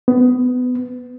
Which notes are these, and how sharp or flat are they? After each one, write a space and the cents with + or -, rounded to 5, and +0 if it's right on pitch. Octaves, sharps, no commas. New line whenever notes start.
B3 +20